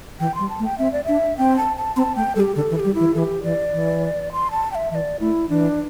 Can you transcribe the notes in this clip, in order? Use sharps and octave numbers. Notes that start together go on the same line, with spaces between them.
E3 G5
G3 C6
A5
A3
G5
C4 E5
D5
D4 E5
C4 G5
A5
A5
C4 C6
A5
A3 G5
G3 A4
G4
D3 A4
E3
A4
G4
G3
E4
E3
E3 A4
G4
E3 D5
E3
C6
A5
G5
E5
E3 E5
D5
A3 E4
E3 D4